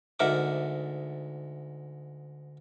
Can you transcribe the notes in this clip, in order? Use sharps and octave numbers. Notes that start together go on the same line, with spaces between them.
D2 G#2 A#4 E5 F#5 D6